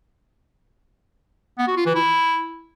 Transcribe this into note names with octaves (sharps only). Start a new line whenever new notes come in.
B3
F#4
F4
E3
E4